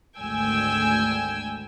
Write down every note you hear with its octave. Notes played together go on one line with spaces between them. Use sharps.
G#1 D2 G5 G#5 E6